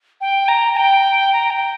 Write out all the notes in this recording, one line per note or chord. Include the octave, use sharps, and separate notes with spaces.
G5
A#5
A#5
G5
A#5
G5